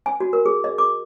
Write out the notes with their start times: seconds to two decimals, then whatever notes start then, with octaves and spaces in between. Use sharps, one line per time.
0.06 G#5
0.20 F#4
0.33 A#4
0.46 G#4
0.64 D#5
0.78 D6